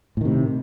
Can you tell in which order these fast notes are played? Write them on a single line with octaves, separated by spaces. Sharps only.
A2 D#3 C3